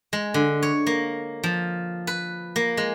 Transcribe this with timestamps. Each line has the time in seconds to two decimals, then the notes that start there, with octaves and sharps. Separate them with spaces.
0.13 G#3
0.34 D3
0.62 C#5
0.87 A#3
1.43 F3
2.07 B4
2.56 A#3
2.77 G#3